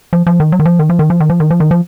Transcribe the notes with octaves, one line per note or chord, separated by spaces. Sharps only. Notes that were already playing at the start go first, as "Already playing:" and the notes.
F3
F3
D#3
F#3
D#3
F3
D#3
F3
D#3
F3
D#3
F3
D#3
F3
D#3
F3